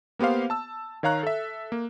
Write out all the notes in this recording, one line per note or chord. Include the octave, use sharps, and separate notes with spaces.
A#3 B3 G4 C5 F5
A5 E6
D#3 C#5 F5 A#5 F#6
A4 E5
A#3